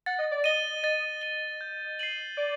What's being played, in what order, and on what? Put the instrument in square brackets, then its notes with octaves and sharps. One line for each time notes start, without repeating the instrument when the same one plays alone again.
[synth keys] F#5 [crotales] A6
[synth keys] D#5
D5
[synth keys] D#5 [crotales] D#7 G7
[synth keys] D#5 [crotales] A6
[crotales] D#7 G7
G6
C7 D#7 F#7
[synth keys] D5 [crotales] G6